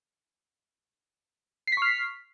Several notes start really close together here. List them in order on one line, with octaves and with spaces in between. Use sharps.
C7 B6 C#6 F6